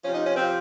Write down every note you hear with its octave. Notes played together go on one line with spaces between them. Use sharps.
C3 F3 C#4
D#4
C#4
C3 F3 C4